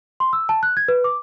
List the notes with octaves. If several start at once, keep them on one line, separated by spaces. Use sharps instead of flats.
C6
E6
A5
F#6
G#6
B4
D6